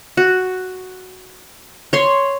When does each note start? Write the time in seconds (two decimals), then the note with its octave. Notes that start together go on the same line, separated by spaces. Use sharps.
0.17 F#4
1.93 C#5 C6